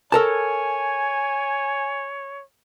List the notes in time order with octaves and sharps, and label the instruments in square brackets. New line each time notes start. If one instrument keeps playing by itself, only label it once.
[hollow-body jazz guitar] A4 A#4 A5 [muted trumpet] C#5 [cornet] G#5